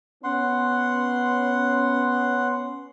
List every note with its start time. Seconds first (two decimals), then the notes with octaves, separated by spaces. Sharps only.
0.24 B3 C#4 F#5 C6